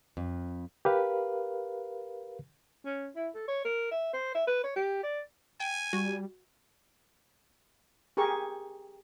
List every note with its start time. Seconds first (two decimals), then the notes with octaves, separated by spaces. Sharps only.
0.17 F2
0.85 G4 A#4 B4 F5
2.85 C#4
3.16 E4
3.35 A4
3.48 C#5
3.65 A#4
3.91 E5
4.13 C5
4.35 E5
4.47 B4
4.64 C#5
4.76 G4
5.03 D5
5.60 G5 G#5
5.93 G3 F#4
8.17 G4 G#4 A#4 C#6